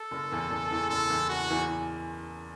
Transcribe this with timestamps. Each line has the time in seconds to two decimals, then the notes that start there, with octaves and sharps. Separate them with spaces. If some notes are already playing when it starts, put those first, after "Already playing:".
Already playing: A4
0.11 F#1
0.31 E2 E3
0.50 F#1
0.70 E2 E3
0.90 F#1 A4
1.10 E2 E3
1.29 F#1 F#4
1.50 E2 E3